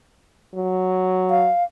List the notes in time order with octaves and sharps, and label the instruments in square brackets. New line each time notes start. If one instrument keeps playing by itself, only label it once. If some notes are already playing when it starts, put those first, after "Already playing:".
[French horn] F#3
[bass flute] F5